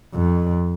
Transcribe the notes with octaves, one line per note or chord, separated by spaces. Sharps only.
F2